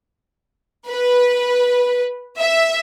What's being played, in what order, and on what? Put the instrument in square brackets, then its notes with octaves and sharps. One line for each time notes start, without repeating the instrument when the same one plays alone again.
[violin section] B4
E5